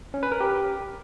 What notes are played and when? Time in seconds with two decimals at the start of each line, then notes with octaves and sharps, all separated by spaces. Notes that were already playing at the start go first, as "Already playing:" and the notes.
0.14 C#4
0.23 B4
0.32 A#4
0.40 G4